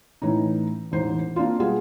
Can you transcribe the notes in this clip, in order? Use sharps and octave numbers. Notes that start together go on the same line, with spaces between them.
A2 E3 C#4 D#4
E1 A1 D#4 C5
A#3 C4 D4 F4
B2 G3 B3 F4 G#4